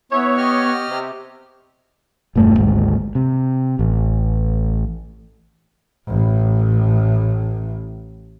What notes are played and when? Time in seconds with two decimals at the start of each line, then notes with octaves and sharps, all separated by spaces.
0.12 B3 E4 C#5
0.37 G4 D#5 F6
0.90 C3
2.36 E1 G2 A3
2.58 G#1 D2 G#2
3.15 C3
3.79 A1
6.07 A1 A2